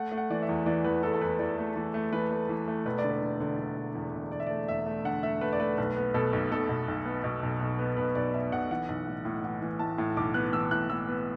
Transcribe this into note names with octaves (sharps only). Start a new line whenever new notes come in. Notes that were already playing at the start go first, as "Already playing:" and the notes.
Already playing: A3 F#5
A3
F#5
E3 D5
E5
E2
E3 D5
E2 B4
E2 A4
A4
E2 B4
E2 D5
A3
E3
A3
E3 B4
A3
E3
A3
E1 B4
D5
D3
B4
D3
D3
D3
E1
E2
E1
E1 D5
E5
A3 D5
E1 E5
A3
D3 F#5
A3 E5
A3 B4
D5
A3 B4
B1 B4
B3
B2 A4
B1
B1 A4
B2
B1
B3
B2
B1
B1
B3
B1 B4
B1 D5
B1 E5
B1 F#5
E3 F#5
B1
A2
A2
E3 F#5
E3
A2 A5
A2
B1 D6
B3 F#6
E3 E6
A2 F#6
E3 E6
B3